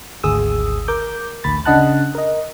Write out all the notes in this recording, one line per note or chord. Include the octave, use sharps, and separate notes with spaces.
G#1 D2 G#4 D#6 E6
A#4 D6 G6
A1 D2 B5 A6
C#3 D4 D#5 F#5 A5 F#6
A#4 D#5